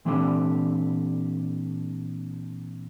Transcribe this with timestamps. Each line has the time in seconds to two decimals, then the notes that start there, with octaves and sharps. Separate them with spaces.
0.05 A#2 E3 C4 D4 G4 A4